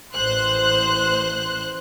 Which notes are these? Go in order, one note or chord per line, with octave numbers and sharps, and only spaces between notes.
A1 C5 F#6